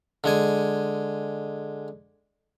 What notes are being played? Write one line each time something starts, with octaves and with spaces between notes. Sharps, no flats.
D3 G#3 G#5